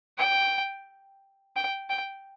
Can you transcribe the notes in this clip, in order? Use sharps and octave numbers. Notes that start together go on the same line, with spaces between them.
G5
G5
G5